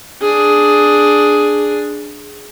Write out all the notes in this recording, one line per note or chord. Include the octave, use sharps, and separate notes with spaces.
D4 G#4